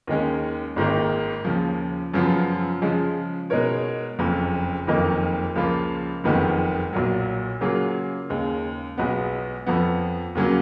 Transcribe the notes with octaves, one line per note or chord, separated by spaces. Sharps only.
D#2 D#3 G#3 C#4
G#1 G#2 D#3 A#3
D#2 C#3 F3
F#2 C#3 F3 B3 F4
C#3 F3 G#3
B2 G#3 D#4 A#4 C#5
F#1 F2 C#3
F#1 F2 D#3 A#3 D#4
C#2 C#3 F3 A#3 F4
F#1 F2 D#3 G#3 B3
B1 A#2 F#3
C#3 F#3 A#3 F4 G#4
D#2 C#3 G#3
B1 B2 G#3 B3
F2 F3 B3
D#2 C#3 F#3 A#3 C#4